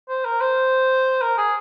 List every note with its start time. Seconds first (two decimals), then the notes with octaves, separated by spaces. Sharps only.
0.09 C5
0.25 A#4
0.41 C5
1.22 A#4
1.38 G#4